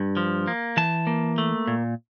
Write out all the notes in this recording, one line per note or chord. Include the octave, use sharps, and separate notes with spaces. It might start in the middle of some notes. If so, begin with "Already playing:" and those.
Already playing: G2
F3
A#3
E3 A5
A#3
A3
A#2